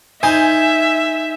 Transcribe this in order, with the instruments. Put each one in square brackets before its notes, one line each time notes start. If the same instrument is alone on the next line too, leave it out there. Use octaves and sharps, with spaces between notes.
[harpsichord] D#4 C5 [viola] E5 [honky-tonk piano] G#5